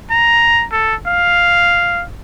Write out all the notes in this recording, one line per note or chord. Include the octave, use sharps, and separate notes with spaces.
A#5
A4
F5